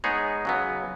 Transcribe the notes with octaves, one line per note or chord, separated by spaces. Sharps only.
G#3 B3 D#4 G#4 C#5
C#3 F#3 B3